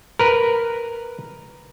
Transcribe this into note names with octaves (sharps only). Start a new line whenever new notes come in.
A#4 B4